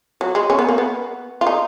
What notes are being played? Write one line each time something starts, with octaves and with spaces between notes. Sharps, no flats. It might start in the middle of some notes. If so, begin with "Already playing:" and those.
F#3
G#3
C#4
B3
A#3
B3
F4
D#4